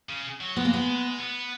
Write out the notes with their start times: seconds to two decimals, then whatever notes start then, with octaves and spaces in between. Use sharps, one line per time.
0.09 C#3
0.41 F#3
0.56 G#3 B3
0.65 A#3
0.73 B3
1.19 B3